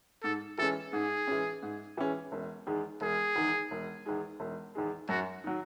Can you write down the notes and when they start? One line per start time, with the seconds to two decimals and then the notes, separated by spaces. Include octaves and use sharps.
0.23 G#2 A4
0.58 E3 G#3 C#4 A4
0.93 G#2 G#4
1.27 E3 G#3 C#4
1.63 G#2
1.97 E3 G#3 C#4
2.32 E1
2.66 E2 D#3 G#3
3.01 E1 G#4
3.36 E2 D#3 G#3
3.71 E1
4.06 E2 D#3 G#3
4.40 E1
4.75 E2 D#3 G#3
5.09 F#2 F#4
5.44 D#3 F#3